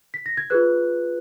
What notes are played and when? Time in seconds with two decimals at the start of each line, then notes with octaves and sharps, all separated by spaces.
0.14 B6
0.26 A#6
0.37 G#6
0.50 F4 G#4 B4 F#6